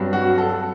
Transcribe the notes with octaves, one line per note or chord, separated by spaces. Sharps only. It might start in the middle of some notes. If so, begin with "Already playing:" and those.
Already playing: G2 F#3 C4
F#4
A4